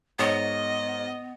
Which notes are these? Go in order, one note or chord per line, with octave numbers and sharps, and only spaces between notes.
G#2 B3 A#4 C#5 D#5